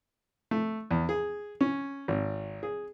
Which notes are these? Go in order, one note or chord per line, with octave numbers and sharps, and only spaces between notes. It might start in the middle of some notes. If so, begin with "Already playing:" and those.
A3
E2
G#4
C#4
G#1
G#4